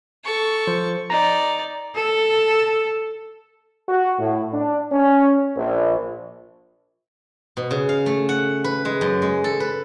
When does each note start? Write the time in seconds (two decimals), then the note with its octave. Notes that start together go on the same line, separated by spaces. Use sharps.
0.25 A4 C#6
0.67 F3 C5
1.10 D#4 D5 A#5
1.95 A4
3.89 F#4
4.19 A2
4.54 D4
4.92 C#4
5.57 A#1
7.57 B2
7.71 C#3
7.89 F5
8.06 A3
8.29 F#5
8.64 B4
8.85 G#3
9.01 F#2
9.22 G#3
9.44 A4
9.60 B4